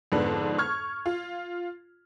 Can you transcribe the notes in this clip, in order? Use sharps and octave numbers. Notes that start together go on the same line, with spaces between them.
F2 G#2 D3 B3 D4
C#6 F6 G#6
F4